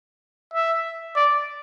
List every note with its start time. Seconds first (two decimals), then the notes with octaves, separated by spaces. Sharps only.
0.54 E5
1.16 D5